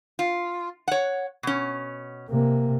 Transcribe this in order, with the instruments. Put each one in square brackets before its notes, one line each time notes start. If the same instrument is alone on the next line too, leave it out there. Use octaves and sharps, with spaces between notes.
[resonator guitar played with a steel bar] F4
C#5 F#5
B2 C#4
[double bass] C3 A#3